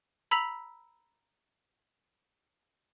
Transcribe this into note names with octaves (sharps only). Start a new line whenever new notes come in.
A#5 B5 E6 B6 F7 F#7